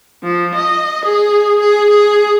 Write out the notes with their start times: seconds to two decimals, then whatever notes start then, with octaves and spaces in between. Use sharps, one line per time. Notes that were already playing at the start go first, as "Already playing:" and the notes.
0.23 F3
0.55 D#5
1.05 G#4
1.59 G#4
1.90 G#4